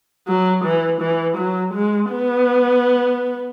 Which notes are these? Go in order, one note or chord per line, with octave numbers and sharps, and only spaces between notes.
F#3
E3
E3
F#3
G#3
B3